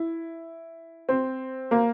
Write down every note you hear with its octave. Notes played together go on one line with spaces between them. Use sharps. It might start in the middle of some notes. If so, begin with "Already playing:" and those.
Already playing: E4
C4
A#3